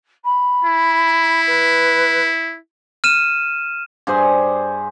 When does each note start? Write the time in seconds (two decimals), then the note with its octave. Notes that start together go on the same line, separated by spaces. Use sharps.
0.24 B5
0.65 E4
1.46 B4
3.04 F6 D#7 E7
4.07 G2 G#4 C5 G#5